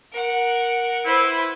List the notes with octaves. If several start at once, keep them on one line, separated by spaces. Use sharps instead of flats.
A#4 F#5
E4 B4 C5